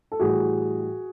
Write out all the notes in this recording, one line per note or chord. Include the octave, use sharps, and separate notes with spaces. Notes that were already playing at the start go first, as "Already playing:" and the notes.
A4
A2 E3 G3 F#4 G#4